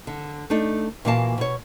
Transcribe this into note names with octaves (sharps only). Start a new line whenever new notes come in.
D3
A3 D4 D#4 A4
A#2 E3 A#3 F#4 F5 A5
B2 C#5